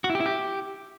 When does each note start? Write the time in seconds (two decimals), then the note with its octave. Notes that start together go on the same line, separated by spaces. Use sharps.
0.04 F#4
0.10 E4
0.15 G4
0.20 E4
0.26 G4